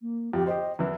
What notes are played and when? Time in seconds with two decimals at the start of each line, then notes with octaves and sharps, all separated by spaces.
0.02 A#3
0.33 F2 G4
0.47 G4 C5 D#5
0.79 E2 E3 B4